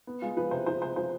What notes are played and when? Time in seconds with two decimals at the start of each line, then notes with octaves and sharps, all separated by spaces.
0.07 B3
0.22 G#3 F4
0.37 F3 B4
0.51 C3 C5
0.66 F3 C5
0.82 C3 C5
0.96 F3 C5